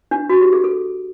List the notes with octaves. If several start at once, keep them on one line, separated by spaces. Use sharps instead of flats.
D4
F#4
G4
G#4
A4